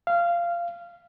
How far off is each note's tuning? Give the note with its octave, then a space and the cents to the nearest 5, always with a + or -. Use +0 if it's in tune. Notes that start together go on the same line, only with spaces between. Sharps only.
F5 -15